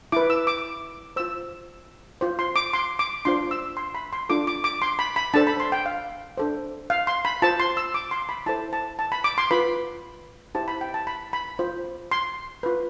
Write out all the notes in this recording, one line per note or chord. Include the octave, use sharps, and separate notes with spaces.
E4 B4 D6
E6
D6
F4 C5 E6
F4 C5
C6
D6
C6
D6
D4 F4 C5 C6
E6
C6
B5
C6
D4 F4 A4 D6
D6
D6
C6
B5
B5
D4 A4 C5 A5
B5
C6
G5
F5
D4 A4 C5
F5
C6
B5
F4 C5 A5
C6
E6
D6
C6
B5
E4 A4 C5 A5
A5
A5
B5
D6
C6
F4 B4 B5
E4 G4 C5 A5
B5
G5
A5
B5
B5
F4 C5
C6
F4 B4